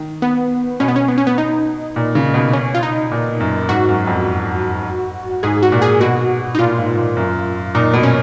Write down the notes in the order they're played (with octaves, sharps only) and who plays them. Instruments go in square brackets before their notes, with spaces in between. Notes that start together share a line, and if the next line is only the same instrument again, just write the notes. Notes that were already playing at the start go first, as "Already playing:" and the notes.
Already playing: [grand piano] D#3
[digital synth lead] B3
[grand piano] B2 [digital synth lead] C#4
[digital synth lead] B3
C#4
B3
C#4
B3
D#4
[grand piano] A#2
C#3
B2
[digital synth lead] C#4
F4
D#4
[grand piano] A#2
F#2
[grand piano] G#2 [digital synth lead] F#4
[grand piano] F#2
F2
[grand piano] G#2 [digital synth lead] G#4
[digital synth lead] F#4
[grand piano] A#2
[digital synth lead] G#4
[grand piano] B2 [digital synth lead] F#4
[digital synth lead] D#4
[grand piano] A#2 [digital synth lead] F4
[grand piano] G#2
A#2
F#2
[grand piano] A#2 [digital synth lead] D#4
[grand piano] B2
[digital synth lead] C#4